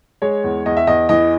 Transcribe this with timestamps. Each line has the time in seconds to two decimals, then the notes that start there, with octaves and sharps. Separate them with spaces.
0.22 G#3 C#5
0.44 E2
0.66 E2 D#5
0.77 E5
0.87 E2 D#5
1.09 E3 D#5